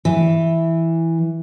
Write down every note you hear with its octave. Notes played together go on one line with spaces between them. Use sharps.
E3